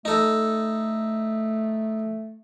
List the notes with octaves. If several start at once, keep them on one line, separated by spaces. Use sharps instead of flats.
A3 D#4 A4